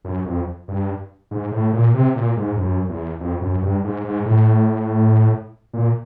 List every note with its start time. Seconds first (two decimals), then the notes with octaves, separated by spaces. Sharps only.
0.05 F#2
0.26 F2
0.68 G2
1.31 G#2
1.52 A2
1.73 A#2
1.94 C3
2.15 A#2
2.37 G#2
2.57 F#2
2.89 E2
3.20 F2
3.41 F#2
3.62 G2
3.84 G#2
4.04 G#2
4.26 A2
5.73 A#2